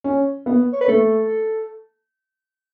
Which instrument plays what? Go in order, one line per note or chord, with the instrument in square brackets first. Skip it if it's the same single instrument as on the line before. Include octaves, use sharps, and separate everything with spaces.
[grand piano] C#4
B3
[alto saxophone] C#5
B4
[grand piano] A3 [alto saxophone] A4